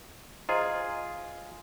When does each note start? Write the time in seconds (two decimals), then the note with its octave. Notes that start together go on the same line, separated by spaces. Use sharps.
0.49 F4 G#4 C5 D#5 A#5